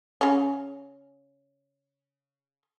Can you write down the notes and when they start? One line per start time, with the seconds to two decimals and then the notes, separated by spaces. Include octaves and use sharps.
0.21 C#3 C#4